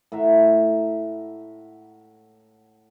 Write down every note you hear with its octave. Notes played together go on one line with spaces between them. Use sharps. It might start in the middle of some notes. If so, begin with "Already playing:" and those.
A2 E5 F#5 A#5